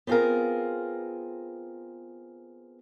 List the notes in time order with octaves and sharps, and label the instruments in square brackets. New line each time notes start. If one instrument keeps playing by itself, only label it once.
[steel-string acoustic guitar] B3 C4 F4 G#4 A#4